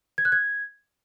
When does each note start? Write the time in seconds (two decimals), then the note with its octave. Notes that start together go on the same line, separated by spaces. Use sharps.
0.18 G#6
0.25 F#6
0.32 G#6